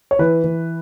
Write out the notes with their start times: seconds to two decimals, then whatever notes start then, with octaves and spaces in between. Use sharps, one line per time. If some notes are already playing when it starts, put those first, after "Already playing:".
0.11 C#5
0.19 E3 B4
0.44 E3